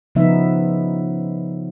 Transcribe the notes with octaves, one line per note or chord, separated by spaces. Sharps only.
C#3 F3 B3 D#4 E5